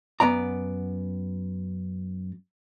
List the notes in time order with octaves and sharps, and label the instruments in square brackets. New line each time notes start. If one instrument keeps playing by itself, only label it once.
[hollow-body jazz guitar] F#2 B3 D5 A#5